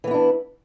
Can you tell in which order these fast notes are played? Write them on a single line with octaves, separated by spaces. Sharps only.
E3 B3 E4 D4